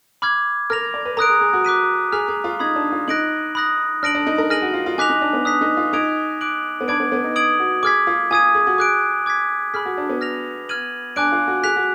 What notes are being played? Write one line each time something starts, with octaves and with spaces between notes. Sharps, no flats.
B5 D6 F6 G#6
A#4 F6 A#6 F7
D5
B4
A#4 A#5 D#6 F#6 D7
G#4
G#4
F#4
D6 F#6 B6 D#7
G#4 A#5 F6 B6 F7
G#4
F4
D#4 B5 D#6 G#6 B6
D4
F4
D#4 F#6 A#6 D7 F#7
B5 D#6 F#6 A#6
D4 F6 A#6 D7 F#7
D4
D#4
A#4
G#4 F6 A#6 D#7 F#7
F#4
F4
F4
D#4 G#5 D6 F#6 B6 F7
D#4
D4
B3
D4 D#6 F#6 B6
D#4
F4
D#4 D#6 G#6 D7 F7
D6 F#6 D7 F#7
B3
D4 B5 D6 G#6 D7
B3
B3
D#4
D#6 G#6 D7 F#7
F#4
G#4 D6 F6 G#6 B6
F4
F4 G#5 D#6 G#6 D#7
G#4
F#4
G#4 D6 F#6 D7
D6 G#6 B6
G#4 B5 F6 B6
F#4
D4
B3
F6 A#6 F7
F6 G#6 D#7 F#7
D4 G#5 D6 F#6 D7
F4
F#4
G#4 F#6 B6 F7
F#4